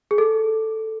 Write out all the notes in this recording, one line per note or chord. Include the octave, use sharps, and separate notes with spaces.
G#4
A4